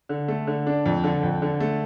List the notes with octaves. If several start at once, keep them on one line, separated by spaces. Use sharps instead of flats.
D3
A3
D3
D4
F2
D3
F2
D3
A3